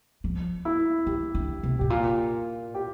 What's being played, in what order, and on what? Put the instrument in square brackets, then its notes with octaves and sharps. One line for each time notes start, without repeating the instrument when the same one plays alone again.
[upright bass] F3
[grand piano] E4
[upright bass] E3 [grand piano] G4
[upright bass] D3
C3
[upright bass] A2 [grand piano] G4
[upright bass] A#2 [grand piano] F4
[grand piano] G4